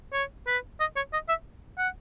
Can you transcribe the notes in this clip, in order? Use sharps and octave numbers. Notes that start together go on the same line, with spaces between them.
C#5
B4
D#5
C#5
D#5
E5
F#5